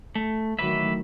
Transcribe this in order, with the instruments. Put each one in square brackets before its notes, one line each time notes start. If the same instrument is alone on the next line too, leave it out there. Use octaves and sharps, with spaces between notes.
[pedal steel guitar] A3
[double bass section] D#3 F#3 A3 [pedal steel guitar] E3 B4 E5